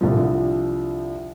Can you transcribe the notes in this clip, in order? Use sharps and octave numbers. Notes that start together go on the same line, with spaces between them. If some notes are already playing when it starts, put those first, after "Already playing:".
C2 D3 F3